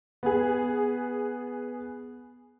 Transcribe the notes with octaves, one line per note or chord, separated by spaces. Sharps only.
B3 G#4